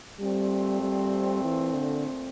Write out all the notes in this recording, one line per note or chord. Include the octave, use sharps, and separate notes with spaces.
A#2 G3 A3 C4
G3
E3
D3